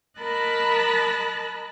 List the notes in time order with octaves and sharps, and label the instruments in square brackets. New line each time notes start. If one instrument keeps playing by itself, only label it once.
[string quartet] A#4 D#5 A5 B5 F#6 A6